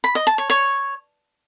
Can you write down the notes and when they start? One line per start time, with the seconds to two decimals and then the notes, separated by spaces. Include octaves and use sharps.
0.04 B5
0.15 D#5
0.27 A5
0.38 C#5
0.50 C#5